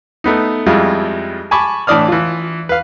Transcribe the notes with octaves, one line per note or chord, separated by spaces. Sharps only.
A3 B3 D#4
F2 G3 G#3 E4 F4
G#5 A5 B5 C#6 D6
A2 E3 D4 D5 D#6 F6
E3 F4
B4 F5